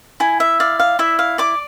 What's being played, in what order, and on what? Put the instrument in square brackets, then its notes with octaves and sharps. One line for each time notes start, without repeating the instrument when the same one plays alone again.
[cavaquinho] E4 G#5
E5
D5 F5
F5
E4 E5
F5
D5 D6